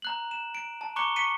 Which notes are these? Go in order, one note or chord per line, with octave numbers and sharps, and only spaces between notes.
A#5 F#6 F#7
E7
D7
A5
A#5 C#6 D6 F#6 C#7 G7
C#6 B6 C#7 D#7